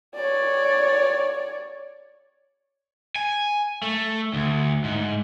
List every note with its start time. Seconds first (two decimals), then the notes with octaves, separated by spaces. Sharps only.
0.14 C#5 D5
3.16 G#5
3.82 A3
4.34 D2
4.84 G#2